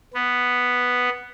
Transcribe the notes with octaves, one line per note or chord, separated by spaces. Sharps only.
B3